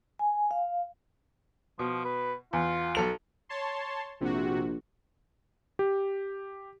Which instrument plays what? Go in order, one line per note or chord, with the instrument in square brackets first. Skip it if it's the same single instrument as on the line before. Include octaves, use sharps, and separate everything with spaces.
[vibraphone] G#5
F5
[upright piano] B2 [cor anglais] F3
[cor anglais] B4
[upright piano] E2 [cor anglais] F4
[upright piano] B1 A4 F7
[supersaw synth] C#5 A5 C6
[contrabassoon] A#1 [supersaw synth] C3 F#4
[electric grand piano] G4